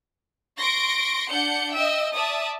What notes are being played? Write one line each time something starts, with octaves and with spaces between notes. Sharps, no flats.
C6 C#6 A#6 D7
D4 F#5 G6 C#7
D#5 E5 G5 E6
D5 E5 A5 D#6